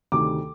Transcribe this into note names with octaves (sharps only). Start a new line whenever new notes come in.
D2 C3 D#3 D6